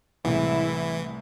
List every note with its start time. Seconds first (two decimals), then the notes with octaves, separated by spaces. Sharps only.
0.25 C2 A2 C3 E3 G#3 E4